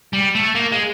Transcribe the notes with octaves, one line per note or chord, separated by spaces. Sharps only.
G3
A3
A#3
G#3